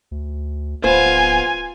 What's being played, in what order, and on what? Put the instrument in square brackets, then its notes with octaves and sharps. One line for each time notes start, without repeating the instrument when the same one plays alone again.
[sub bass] D2
[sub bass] D1 [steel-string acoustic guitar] B3 C5 [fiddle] F4 [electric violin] G#5